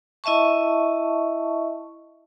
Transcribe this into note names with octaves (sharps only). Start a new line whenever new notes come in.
E4 D#5 E5 A5 C#6